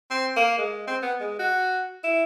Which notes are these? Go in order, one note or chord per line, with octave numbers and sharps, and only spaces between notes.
C4
A#3
G#3
C4
B3
G#3
F#4
E4